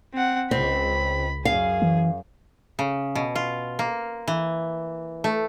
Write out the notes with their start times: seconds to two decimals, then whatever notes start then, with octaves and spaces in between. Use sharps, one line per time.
0.14 C4 F#5
0.51 C#2 C4 B5
1.45 F#2 G#4 F5
1.82 E3
2.79 C#3
3.15 B2
3.35 F4
3.79 A#3
4.28 E3
5.24 A3